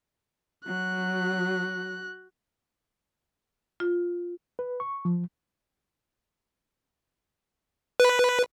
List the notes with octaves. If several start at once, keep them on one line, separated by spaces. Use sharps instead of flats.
F#3 F#4 F#6
F4
B4
C#6
F3
B4